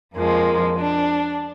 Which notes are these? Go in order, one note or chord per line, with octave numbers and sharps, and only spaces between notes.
F2 F3 G#3 A#3
D4